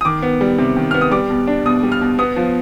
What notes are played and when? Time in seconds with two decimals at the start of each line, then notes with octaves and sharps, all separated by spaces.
0.01 D#6
0.05 D#3 D6
0.22 B3
0.41 G3
0.58 C3
0.76 D#3
0.91 B3 F6
1.01 D#6
1.11 G3 D6
1.30 B2
1.47 D4
1.65 B2 D#6
1.83 G3
1.92 F6
2.01 B2
2.18 B3 D#6
2.36 F3